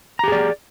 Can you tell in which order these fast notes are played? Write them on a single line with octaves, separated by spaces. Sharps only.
A#5 G4 G#4 D5